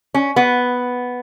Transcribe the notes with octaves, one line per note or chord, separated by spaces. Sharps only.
C#4
B3